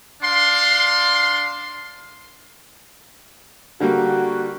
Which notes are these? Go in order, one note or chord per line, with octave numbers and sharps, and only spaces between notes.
D4 F5 C6
D3 G3 A#3 F#4